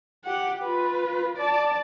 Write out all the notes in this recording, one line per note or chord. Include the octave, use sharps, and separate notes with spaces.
G4 F#5
F4 B4
D5 A5